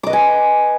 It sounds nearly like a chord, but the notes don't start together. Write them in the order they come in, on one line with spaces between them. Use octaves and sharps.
D6 D#5 B4 G#5